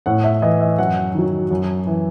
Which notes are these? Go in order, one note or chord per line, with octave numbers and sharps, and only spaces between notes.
A2 F#5
E5
E3 D#5
E5
F#2 F#5
D#3 F#3
F#2
E3